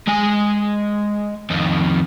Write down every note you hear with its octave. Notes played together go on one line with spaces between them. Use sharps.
G#3 G#5
F2 D#3